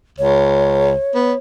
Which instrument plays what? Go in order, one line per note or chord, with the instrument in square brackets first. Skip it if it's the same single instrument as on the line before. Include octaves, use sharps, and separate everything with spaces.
[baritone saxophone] C#2 [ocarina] C#5
[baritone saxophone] B3